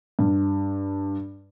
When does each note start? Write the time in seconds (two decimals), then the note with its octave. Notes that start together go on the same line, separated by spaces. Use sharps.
0.19 G2